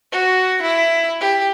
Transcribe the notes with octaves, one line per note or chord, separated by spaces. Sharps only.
F#4
E4
G4